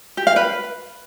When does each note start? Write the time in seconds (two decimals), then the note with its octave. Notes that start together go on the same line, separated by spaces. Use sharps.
0.17 G4
0.27 F5
0.36 B4